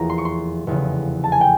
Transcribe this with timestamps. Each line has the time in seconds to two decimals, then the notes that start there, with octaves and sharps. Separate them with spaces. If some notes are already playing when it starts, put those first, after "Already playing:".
Already playing: F1 E2 F3 A#3 A#5
0.10 C6
0.18 C#6
0.25 C6
0.67 F1 E2 C#3
1.24 A5
1.32 G#5
1.41 G5